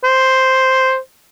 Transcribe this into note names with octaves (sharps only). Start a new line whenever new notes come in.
C5